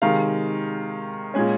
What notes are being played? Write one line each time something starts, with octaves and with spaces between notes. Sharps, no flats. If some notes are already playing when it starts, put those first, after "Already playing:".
C3 D#3 G#3 F5
A#2 G#3 C#4 G#5